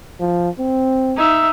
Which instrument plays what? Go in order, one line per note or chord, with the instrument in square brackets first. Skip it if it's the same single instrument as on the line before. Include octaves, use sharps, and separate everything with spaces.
[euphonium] F3
C4
[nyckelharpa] D#4 E5